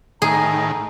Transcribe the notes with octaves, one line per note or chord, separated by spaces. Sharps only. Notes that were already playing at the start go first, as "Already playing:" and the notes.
A2 D#3 G#4 A#5